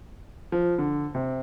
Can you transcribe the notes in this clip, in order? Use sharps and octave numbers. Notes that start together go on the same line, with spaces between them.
F3
D3
C3